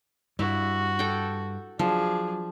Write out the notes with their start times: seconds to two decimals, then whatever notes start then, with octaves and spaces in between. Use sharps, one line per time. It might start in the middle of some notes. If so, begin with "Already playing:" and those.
0.39 G2 E4 F#4
0.99 A4 G5
1.79 F3 F#3 D4 G#4